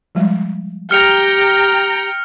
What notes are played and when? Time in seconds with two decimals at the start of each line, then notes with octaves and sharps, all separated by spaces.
0.15 F3 G3 G#3
0.91 G4 G5 A#5 F6 C#7 F7